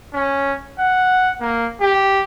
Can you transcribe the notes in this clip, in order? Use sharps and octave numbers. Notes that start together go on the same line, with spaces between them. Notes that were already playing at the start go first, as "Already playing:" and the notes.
C#4
F#5
A#3
G4